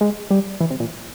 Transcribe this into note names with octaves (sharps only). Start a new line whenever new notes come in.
G#3
G3
E3
C3
A#2